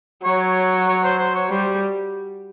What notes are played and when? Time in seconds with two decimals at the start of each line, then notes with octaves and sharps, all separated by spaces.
0.24 F#3 C#5
0.88 C#5
1.03 C5
1.19 C5
1.35 C#5
1.50 G3 C5